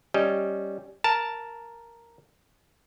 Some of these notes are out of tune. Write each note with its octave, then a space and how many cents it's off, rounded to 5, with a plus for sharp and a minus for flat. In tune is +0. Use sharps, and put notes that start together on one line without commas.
G3 +0 C#4 +0 D#5 +0
A#4 +0 A5 +0